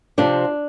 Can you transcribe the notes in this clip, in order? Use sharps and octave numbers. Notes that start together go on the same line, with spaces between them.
C3 F3 C4 D4